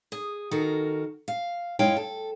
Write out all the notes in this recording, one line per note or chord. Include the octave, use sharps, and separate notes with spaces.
G#4
D#3 F#4 A4 A#4
F5
F#2 G#3 E4 C#5 F5 G5
A4